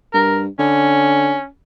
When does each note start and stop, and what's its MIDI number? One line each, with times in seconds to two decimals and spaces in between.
0.14 0.47 43
0.14 0.41 70
0.59 1.37 50
0.59 1.47 61